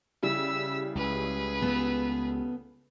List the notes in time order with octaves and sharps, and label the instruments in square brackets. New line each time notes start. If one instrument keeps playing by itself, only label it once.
[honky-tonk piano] C#3 G3 E4 [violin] E6 B6
[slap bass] C#2 [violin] G#4 B4
[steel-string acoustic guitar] B3 A4